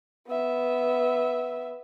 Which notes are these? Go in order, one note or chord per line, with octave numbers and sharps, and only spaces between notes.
B3 E5